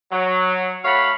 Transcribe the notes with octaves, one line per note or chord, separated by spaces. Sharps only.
F#3
A3 F#4 C#5 F5 F#5 B5